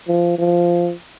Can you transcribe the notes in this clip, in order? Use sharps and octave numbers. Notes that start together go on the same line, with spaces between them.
F3
F3